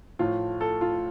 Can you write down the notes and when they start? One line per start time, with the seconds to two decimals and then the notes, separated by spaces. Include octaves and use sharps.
0.19 A2 F3 A3 F4
0.61 A4
0.81 F4